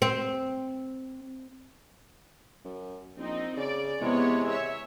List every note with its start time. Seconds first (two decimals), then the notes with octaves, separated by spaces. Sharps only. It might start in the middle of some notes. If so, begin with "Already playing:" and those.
0.02 C4
2.65 F#2
3.17 A#1 C4 D#4
3.57 C#3 D5
4.01 E2 C3 G#3 B3 C#5
4.49 C#5 E5